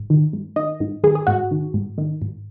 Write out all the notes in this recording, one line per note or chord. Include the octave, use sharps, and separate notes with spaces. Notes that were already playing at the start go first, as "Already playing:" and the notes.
Already playing: G#2
D#3
G#2
D#3 D#5
G#2
D#3 G#4
G#4
G#2 F#4
D#3
G#2
D#3
G#2